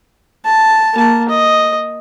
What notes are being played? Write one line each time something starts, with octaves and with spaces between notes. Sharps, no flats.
A5
A#3 A5
D#5